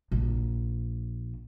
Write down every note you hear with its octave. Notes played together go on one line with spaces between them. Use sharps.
A#1